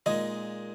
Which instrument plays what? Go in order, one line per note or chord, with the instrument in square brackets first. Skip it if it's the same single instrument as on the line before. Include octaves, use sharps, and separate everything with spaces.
[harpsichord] A#2 G#3 D#4 G#4 [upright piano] D#5